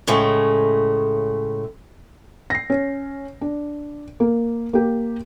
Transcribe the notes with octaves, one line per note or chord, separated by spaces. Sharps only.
A2 C#3 G#3 A3
A#6 C7
C#4
D4
A#3
A#3 G4